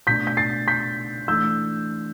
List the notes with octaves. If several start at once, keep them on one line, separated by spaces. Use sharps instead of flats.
B2 A3 D4 G6 B6
G6 B6
A6 C7
G6 B6
E3 A3 D4 E6 G6